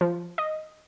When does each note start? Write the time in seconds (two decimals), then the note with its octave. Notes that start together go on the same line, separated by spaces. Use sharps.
0.01 F3
0.38 D#5